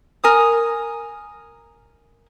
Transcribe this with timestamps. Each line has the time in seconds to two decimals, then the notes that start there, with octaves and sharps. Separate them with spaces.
0.24 A#4 G#5 D#6